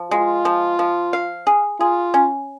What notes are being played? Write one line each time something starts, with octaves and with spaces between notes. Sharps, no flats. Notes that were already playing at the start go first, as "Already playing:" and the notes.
Already playing: F3
G#3 F4
F3
F3
F5
G#4
F4 G#4
C#4